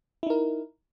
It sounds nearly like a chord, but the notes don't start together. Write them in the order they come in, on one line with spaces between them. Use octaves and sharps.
E4 D#4 A#4